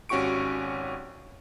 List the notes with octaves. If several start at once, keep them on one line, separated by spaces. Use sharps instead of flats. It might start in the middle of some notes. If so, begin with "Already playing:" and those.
G#1 C#4 F#4 G4 C#6 D7